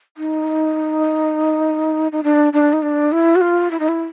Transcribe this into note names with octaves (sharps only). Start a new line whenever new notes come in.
D#4
D#4
D4
D4
D#4
D4
E4
F#4
F4
E4
D#4
E4